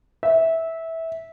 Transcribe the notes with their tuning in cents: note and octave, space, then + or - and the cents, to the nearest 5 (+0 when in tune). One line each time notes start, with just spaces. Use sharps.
E5 -15